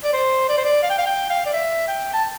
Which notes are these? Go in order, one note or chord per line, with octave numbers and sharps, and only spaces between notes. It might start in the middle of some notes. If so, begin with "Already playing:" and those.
D5
C5
D5
C5
D5
F5
G5
F5
G5
F5
D5
E5
G5
A5